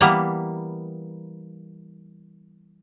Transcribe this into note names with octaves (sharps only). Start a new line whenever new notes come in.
E3 G3 A#3 B3 A#4 A#5